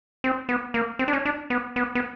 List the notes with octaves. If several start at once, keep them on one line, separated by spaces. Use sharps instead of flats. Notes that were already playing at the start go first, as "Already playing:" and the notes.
C4
B3
A#3
C4
D4
C#4
D4
B3
B3
B3